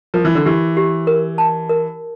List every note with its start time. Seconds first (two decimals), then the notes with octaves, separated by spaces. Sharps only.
0.14 F3 A#4
0.25 E3
0.35 D3
0.46 E3 G4
0.77 G4
1.07 A#4
1.38 A5
1.69 A#4